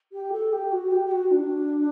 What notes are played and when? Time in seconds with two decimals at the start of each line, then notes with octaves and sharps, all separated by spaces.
0.12 G4
0.32 A4
0.52 G4
0.71 F#4
0.91 G4
1.05 G4
1.11 F#4
1.31 D4